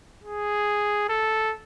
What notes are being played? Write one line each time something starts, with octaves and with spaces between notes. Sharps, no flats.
G#4
A4